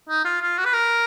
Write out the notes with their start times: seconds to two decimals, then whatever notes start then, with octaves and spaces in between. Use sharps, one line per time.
0.09 D#4
0.25 F4
0.42 F4
0.58 F#4
0.65 B4
0.73 A#4